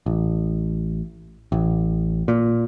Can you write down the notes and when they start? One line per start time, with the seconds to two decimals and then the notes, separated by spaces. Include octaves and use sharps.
0.06 A1
1.52 A1
2.28 A#2